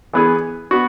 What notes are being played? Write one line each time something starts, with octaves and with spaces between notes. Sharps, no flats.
E3 B3 E4 G#4
B3 F#4